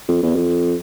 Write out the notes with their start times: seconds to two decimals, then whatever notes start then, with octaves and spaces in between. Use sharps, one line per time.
0.08 F2
0.22 E2
0.35 F2